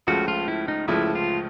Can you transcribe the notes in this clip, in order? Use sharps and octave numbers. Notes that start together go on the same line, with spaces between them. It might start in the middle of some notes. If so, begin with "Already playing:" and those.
C#2 C#3 F3 A3 F#4
F4
E4
D#4
C#2 C#3 F3 A3 E4
F4